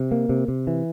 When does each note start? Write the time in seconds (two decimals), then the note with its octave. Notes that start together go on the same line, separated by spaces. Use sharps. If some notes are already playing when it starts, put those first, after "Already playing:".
Already playing: C3
0.11 A#3
0.29 C3
0.48 C3
0.67 E3